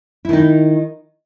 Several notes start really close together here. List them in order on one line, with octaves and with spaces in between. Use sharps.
E4 D#3 D#4